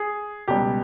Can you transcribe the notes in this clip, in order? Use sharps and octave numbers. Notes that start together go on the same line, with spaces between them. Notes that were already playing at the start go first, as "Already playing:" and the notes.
Already playing: G#4
C#2 B2 G3 G4